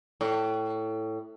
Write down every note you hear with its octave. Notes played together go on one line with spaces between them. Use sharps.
A2